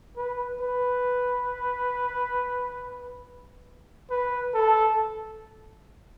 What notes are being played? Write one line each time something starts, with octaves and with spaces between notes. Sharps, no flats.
B4
B4
B4
A4